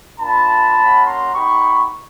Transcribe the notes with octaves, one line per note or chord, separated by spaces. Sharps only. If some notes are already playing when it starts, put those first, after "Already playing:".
A#3 D4 F4 A5 B5
A#3 C#4 F#4
A#5 C6
B3 D#4 G4 B5 C#6